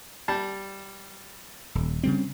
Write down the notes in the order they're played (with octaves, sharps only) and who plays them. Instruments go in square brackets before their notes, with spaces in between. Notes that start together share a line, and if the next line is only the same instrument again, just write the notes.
[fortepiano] G3 A5
[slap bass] D#1
C#3 G3 C4